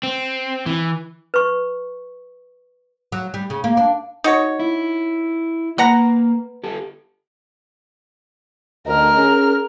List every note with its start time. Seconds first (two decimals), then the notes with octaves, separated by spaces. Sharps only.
0.03 C4
0.66 E3
1.34 B4 C#6
3.12 F#3
3.34 G3
3.50 C#3
3.64 A#3
3.77 D4
4.24 D#4 F#4 C#5
4.59 E4
5.78 A#3 B4 F#5 A#5
6.64 G3 G4 A4
8.87 D2 A#4 D#5 F6
9.17 C#4 G#4